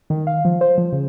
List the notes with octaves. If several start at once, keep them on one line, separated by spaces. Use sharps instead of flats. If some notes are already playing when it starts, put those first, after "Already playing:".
D#3
F5
F3
C5
F3
C#3